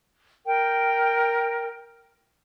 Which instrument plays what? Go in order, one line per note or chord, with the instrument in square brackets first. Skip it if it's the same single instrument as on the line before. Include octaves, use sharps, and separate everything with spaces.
[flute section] A#4 G5